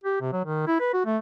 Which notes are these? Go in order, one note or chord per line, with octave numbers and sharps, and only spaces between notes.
G4
C3
F#3
D#3
E4
B4
F#4
A3